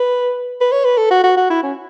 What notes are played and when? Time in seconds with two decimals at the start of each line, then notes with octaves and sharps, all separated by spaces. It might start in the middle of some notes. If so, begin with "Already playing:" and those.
Already playing: B4
0.61 B4
0.72 C#5
0.85 B4
0.97 A4
1.10 F#4
1.24 F#4
1.37 F#4
1.50 E4
1.63 C#4